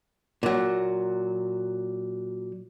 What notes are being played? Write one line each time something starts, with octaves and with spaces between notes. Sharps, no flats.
A#2 F#3